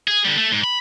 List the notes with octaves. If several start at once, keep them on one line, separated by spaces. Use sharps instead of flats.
G#4
D3 G3
A3
G#2
B5